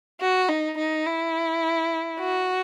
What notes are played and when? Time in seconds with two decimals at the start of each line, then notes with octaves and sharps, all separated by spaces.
0.21 F#4
0.49 D#4
0.78 D#4
1.06 E4
2.19 F#4